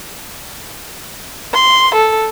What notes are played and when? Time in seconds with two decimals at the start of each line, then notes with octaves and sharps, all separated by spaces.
1.54 C6
1.94 A4